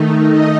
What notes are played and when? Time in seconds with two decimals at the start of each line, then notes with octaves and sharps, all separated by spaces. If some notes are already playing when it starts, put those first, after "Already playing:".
Already playing: D#3 A3 D#4
0.30 D#5